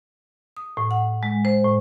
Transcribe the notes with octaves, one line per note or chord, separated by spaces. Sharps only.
D#6
A2
F#5
G#3
C5
A2